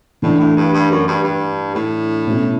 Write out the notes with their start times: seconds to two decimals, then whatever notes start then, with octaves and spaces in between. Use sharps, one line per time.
0.22 A2 E3 A3 D4
0.40 A2
0.57 G2
0.74 G2
0.91 F#2
1.08 G2
1.24 G2
1.75 A2
2.26 B2 A3 C#4 E4